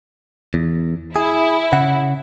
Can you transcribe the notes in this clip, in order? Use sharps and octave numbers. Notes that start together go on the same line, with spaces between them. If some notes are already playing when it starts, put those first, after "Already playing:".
E2
E4 G#4
C#3 F#5